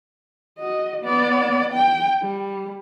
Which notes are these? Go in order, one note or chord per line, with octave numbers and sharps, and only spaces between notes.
F#4 D#5
B3 D5
G5
G3